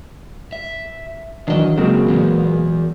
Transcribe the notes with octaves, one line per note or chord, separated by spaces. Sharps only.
E5
D#3 E3 F#3 D4 D#5
C#2 C#3 F#3 G#3 A#3 C4
E2 A#2